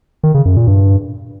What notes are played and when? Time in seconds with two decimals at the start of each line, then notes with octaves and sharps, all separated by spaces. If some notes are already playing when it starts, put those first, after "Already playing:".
0.23 D#3
0.34 C#3
0.45 F#2
0.56 A#2
0.67 G2